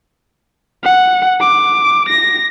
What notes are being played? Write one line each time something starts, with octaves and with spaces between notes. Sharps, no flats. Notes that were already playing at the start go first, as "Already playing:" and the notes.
F#5
D6
A#6